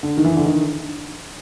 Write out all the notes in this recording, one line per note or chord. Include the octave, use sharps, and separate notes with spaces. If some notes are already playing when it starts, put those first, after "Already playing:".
D3
D#3
E3
D3
D#3